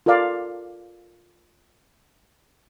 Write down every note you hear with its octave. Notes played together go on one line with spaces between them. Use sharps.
F4 A4 A#4 D5 F5